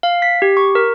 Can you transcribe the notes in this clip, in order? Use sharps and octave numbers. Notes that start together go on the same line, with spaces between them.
F5
B6
G4
C#6
A#4